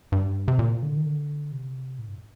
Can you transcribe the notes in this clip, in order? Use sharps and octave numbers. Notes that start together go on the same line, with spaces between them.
G2
C3
A#2
D3
D#3
D3
C3
A2
G2